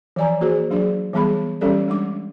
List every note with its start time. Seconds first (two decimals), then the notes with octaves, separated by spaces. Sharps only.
0.16 E3 F3 D5 G#5 A#5
0.41 A#3 F#4 G#4 C5
0.70 F#3 D4 G#4 D5
1.13 E3 G3 B3 G#4 B5
1.61 E3 G3 C#4 G4 A4 D5
1.88 G3 G#3 D4 D6